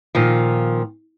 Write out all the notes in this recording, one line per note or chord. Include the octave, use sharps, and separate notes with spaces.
A#2 D#3 F3